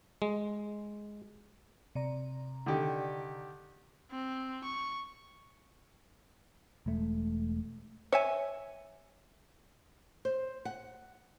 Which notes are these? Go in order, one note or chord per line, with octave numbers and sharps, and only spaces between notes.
G#3
C3 D5 A#5
D3 D#3 G4
C4
C#6
E1 G#3 A3
C#5 E5 G#5
C5
F#5